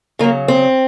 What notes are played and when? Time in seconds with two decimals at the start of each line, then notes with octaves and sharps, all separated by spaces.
0.19 C#3 F#3 A#3
0.48 C4